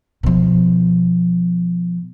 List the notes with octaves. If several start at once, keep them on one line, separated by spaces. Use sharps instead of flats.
B2 F3